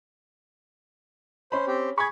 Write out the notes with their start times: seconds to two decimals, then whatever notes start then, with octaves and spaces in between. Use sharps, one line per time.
1.52 C#4 C5 B5
1.67 C4 G4
1.98 G#4 B5 C#6 G#6